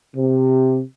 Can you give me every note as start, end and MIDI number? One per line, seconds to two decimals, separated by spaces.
0.16 0.81 48